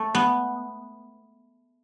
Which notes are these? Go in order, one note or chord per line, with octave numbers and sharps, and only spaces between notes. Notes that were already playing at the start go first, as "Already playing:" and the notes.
Already playing: A3
B3